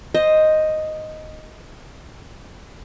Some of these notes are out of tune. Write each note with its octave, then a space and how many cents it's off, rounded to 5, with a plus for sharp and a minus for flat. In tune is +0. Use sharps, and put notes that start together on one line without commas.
C5 +0 D#5 +0